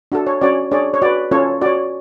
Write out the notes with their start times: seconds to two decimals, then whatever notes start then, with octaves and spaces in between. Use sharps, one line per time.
0.12 D4 F#4 A4
0.27 C#5
0.41 C#4 F#4 C#5 D5
0.71 D4 G#4 C#5 D5
0.94 C#5
1.02 F#4 B4 D5
1.31 C#4 F4 A4 C#5
1.62 F#4 C#5 D5